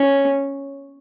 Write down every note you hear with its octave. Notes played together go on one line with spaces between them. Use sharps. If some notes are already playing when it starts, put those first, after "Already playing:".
Already playing: C#4